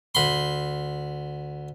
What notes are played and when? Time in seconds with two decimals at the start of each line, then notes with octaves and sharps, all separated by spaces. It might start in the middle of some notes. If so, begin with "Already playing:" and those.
0.15 D2 B5 C6